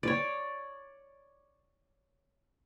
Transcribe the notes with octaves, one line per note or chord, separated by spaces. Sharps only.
C#5 D5